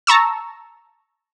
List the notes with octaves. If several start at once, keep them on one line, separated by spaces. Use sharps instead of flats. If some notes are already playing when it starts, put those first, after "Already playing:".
A5 A#5 C#6 E6